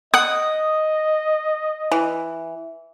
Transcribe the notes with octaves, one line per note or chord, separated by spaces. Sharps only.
D#5 F#5 D#6 F#6
E3